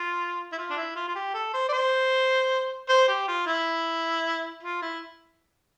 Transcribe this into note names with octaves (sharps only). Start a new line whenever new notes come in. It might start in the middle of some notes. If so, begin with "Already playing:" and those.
Already playing: F4
E4
F4
D4
E4
F4
F4
G4
A4
C5
D5
C5
C5
G4
F4
E4
F4
E4